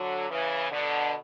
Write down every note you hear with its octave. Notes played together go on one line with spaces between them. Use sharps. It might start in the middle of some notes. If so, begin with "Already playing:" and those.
Already playing: D3 F#3
C#3 E3
B2 D3